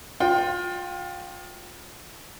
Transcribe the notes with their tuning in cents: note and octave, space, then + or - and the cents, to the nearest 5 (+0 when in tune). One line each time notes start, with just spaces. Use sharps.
F4 +30 G5 +0 C6 +0